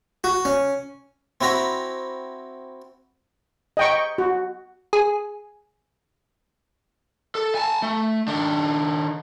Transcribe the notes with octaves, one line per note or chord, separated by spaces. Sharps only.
F#4
C#4
C4 E4 F#4 A#5 B5
D#5 G5 C#6
F#4
G#4
A4
G#5 A5
A3
D#3 D4